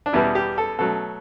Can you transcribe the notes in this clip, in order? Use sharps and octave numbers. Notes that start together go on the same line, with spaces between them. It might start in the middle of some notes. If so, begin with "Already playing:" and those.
D4
E2 B2 G3 B3 E4
G4
A4
B2 F#3 A3 A4